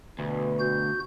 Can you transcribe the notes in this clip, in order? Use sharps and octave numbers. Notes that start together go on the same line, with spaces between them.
D2 B2 B4
F#4 G6